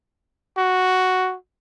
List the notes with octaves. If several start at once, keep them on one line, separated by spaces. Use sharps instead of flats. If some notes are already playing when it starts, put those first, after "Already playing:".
F#4